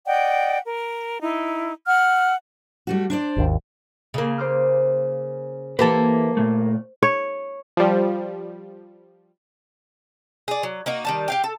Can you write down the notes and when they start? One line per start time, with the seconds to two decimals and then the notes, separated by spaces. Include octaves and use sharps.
0.06 D5 D#5 F#5 G5
0.65 A#4
1.21 D#4 E4
1.87 F#5 F6
2.87 G3 A3 F#4
3.10 D4 C5 D5
3.37 G#1 D#2
4.14 C#3 A#3
4.38 C5 D6 F6
5.79 E3 A#3 G4 A4 B4
6.37 A#2 A3
7.03 C#5
7.77 F3 G3
10.48 G#4 D5
10.63 F#3
10.86 A#3 D#4 F#4
11.05 D#3 G3 A5
11.28 G4 F5 G5
11.44 A4